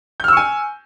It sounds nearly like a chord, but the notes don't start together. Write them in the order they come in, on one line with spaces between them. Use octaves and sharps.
G6 F6 E6 C#6 G#5